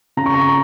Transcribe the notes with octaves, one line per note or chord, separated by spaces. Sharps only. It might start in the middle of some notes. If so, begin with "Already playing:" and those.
C#3 A#5
C#6
A#5